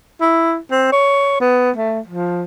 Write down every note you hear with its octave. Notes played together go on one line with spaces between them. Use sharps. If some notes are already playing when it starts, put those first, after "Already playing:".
E4
C4
C#5
B3
A3
F3